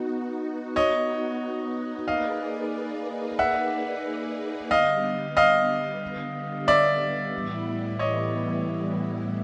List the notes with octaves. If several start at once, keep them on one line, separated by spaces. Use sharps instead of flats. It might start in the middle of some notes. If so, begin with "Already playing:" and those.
Already playing: B3 D#4 F#4
C#5 D#5
A#3 D#4 G#4 B4 D5 D#5 F5
E5 F#5
D3 G3 B3 D#5 F5
D#5 F5
D5 E5
A2 E3 G3 B3 E4
C#5 D#5